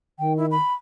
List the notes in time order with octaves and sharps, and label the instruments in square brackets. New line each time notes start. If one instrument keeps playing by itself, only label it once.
[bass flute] D#3 [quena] G5
[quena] E4
B5